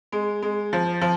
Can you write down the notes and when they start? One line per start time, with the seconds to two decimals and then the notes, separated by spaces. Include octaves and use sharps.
0.12 G#3
0.42 G#3
0.73 F3
1.01 F3